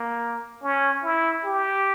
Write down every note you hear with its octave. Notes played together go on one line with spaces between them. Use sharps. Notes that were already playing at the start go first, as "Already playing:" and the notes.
Already playing: A#3
C#4
E4
G4